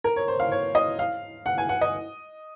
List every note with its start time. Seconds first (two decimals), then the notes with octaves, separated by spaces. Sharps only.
0.04 A#4
0.16 C#5
0.28 C5
0.40 F5
0.52 C#5
0.75 D#5
0.99 F5
1.46 F#5
1.58 G#5
1.69 F#5
1.81 D#5